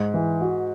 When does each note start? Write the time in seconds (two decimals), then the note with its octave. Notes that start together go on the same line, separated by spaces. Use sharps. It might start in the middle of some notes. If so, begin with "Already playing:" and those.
Already playing: G#2
0.14 E3
0.41 F#4